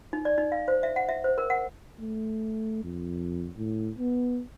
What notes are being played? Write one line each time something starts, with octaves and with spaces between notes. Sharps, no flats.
D#4
D5
D#4
F5
C5
E5
F#5
E5
C5
A#4
F#5
A3
F2
A2
B3